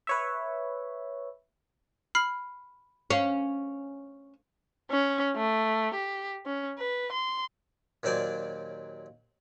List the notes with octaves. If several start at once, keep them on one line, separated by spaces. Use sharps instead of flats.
B4 C#5 E5
B5 F6 C7
C#4 C5 F5
C#4
A3
G4
C#4
B4
C6
D#2 A#2 F#3 C5 D5 G#5